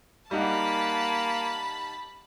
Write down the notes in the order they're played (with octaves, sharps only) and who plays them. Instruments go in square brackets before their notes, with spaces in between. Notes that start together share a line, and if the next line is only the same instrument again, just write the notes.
[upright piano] G3 D#4 F#5 [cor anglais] A#3 [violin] A5 B5